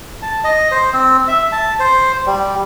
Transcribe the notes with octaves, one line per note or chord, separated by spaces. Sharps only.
A5
D#5
C5
C4
E5
A5
C5
G3